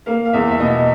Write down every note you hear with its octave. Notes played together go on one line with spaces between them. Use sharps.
A#3 F5
F5
E2 E5
E5
B2 D#5